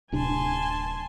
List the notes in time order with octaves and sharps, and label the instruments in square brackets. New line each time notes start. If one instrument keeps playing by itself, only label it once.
[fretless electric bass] D1 C3 D4 [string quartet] G#5 A5 C6